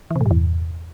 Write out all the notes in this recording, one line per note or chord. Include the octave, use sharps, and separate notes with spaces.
E3
C3
A2
G2
E2